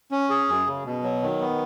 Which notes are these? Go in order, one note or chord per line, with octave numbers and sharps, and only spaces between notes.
C#4
G#4
F#2
C#3
B2
F#3
D#3
B3